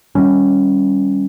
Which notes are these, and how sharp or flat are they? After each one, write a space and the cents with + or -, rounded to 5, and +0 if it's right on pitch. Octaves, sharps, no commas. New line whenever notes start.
D#3 +0 G3 +0 C#4 +0